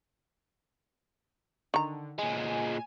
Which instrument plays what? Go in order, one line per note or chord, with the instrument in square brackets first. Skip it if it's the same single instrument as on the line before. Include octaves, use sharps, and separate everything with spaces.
[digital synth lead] D3 [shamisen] D#3 A#5
[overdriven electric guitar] A#2 G#3 [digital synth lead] G#5